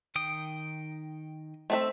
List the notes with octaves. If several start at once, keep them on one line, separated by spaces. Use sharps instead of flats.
D#3 G5 D#6
A3 C4 E5